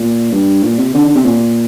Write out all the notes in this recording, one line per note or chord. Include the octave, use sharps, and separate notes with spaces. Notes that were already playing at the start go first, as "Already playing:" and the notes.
Already playing: A#2
G2
A#2
C3
D3
D3
C3
A#2